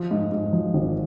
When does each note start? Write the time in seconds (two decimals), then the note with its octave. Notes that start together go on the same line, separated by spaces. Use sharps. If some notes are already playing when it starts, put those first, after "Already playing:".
Already playing: F3
0.11 G#2
0.32 G#2
0.53 F3
0.74 G#1